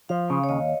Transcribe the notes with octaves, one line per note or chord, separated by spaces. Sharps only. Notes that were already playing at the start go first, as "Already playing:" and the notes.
F3 F5
C#3
C#5
D#2 D#5